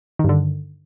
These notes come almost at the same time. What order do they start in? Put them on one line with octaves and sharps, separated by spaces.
D#3 G2 D3